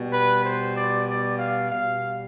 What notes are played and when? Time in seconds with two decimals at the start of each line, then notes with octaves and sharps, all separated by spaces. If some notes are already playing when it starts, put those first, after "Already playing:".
Already playing: B2 G3
0.12 B4
0.44 C5
0.75 D5
1.07 D5
1.37 F5
1.68 B2 G3 F5